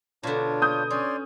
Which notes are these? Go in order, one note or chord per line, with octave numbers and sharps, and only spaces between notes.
B2 D3 D4 F4 C#5
D#6 G6
C#4 C#5 D5 C6